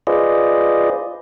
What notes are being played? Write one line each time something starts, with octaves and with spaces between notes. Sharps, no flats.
F4 G#4 B4 C5 D5 D#5